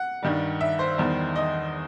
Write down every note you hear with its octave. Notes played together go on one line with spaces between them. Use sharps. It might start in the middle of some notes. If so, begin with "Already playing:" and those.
Already playing: F#5
G2 D#3 G3
E5
C5
E2 D#3 G3
D#5